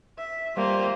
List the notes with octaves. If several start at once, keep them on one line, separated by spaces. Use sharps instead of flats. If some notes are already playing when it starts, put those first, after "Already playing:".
E5
G3 A#3 F4 C5